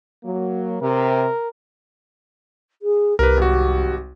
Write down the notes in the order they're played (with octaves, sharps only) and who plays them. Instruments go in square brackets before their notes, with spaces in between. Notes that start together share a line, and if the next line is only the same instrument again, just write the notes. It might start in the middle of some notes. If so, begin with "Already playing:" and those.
[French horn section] F#3 A#3
[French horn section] C3 [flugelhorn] A#4
[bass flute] G#4
[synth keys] C2 [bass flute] G4 [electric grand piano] A#4 B4
[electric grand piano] G#1 F#4